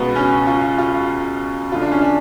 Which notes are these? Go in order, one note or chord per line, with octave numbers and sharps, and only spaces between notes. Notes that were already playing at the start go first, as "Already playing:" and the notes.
Already playing: C#2 B2 B3
C#4
F4
F4
D2 D3 F4
D4
C#4
D4